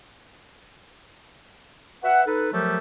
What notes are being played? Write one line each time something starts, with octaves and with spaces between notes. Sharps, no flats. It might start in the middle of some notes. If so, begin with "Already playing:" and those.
B4 E5 F#5
D#4 A4 B4
F3 F#3 A3 G4 A#4